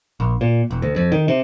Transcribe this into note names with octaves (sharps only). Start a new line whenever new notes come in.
A#1
A#2
E1
D2
F2
D#3
C3